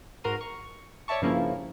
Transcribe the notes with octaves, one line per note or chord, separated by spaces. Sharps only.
G#2 F#4 A#4 A#5 C6 D#7
C#6
C#5 D5 E5 A5 C#6
G2 C#3 F3 A#3 C#4 E4